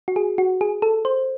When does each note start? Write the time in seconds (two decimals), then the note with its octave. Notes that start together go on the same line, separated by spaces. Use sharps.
0.08 F#4
0.16 G#4
0.38 F#4
0.61 G#4
0.82 A4
1.05 C5